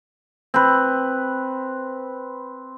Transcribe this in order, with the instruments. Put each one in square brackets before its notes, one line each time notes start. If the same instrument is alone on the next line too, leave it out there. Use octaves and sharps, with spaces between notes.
[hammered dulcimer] C4 B4